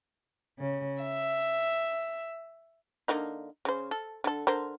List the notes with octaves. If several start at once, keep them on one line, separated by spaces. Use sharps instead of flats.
C#3
E5
D3 A#3 D#4
C#3 C5
A4
D3 A4
D3 A#4 C5